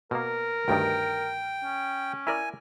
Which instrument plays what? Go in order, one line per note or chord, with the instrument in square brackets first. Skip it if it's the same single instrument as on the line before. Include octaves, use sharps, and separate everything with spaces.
[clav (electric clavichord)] B2 A#3 [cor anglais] A#4
[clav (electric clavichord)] D2 G2 D#3 [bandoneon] G5
[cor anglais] C#4
[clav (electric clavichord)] E4 A#4 D5 [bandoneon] G#5